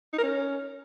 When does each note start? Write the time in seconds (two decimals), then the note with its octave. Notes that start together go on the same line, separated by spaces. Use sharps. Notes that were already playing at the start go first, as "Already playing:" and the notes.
0.13 D#4
0.18 A#4
0.24 C#4